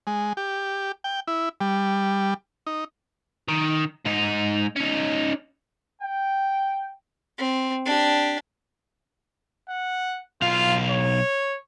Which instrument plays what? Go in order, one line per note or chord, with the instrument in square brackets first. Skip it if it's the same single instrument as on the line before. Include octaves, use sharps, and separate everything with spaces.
[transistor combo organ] G#3
G4
G5
E4
G3
D#4
[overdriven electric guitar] D#3
G#2 D#4
C#4 D#4
[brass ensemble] G5
[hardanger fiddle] C4
D4 G4
[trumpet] F#5
[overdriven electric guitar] B1 F5 [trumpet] F4
[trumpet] C#5